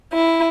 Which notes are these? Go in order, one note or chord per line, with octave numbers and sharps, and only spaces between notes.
E4